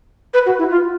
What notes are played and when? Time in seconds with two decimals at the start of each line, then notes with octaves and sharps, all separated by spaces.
0.34 B4
0.46 F#4
0.59 E4
0.70 F4